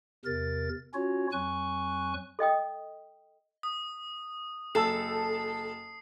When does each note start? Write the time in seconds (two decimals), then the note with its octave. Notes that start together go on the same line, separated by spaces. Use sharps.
0.25 E2 C3 A#4 A6
0.94 C#4 F4 F#4 C#5
1.32 F2 F#3 G#5 C#6 F#6
2.39 A4 D#5 G5 D#6
3.63 D#6
4.75 F#1 A4 A5 E6 C7